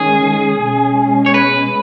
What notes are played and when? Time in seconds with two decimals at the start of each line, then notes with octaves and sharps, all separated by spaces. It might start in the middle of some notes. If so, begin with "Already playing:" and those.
Already playing: D#3 G#3 C#4 G#4
0.59 B2 G#3 C#4
1.26 C#5
1.34 B4